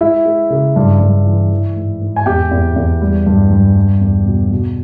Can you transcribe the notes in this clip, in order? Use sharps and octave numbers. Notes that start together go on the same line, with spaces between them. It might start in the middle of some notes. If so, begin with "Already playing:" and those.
G#3 E4 E5
G#3
C#3
G2
G2
E3
E3
G#2
G#2
G#5
E2 G4 G5
E2
E2
G3
G2
G2
G3
E2
B2
B2